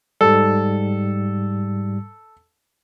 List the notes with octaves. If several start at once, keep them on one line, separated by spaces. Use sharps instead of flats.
G#2 G3 A4